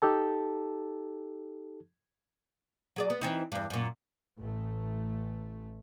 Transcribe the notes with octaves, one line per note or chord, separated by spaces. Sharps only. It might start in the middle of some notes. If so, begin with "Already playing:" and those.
D#4 G4 A4 A5
F#3 G#4 D5
B3
E3 C4 D#4
E2 G2
F#2 A#2
A1 A3